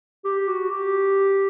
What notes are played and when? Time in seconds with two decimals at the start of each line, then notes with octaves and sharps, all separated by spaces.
0.25 G4
0.47 F#4
0.69 G4